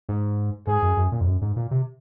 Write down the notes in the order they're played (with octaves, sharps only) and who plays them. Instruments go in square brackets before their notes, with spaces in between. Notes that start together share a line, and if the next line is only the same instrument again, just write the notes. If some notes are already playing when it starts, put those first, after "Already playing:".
[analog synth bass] G#2
[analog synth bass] G#2 [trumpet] G#4
[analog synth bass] F#2
F#2
A#2
F2
F#2
G#2
A#2
C3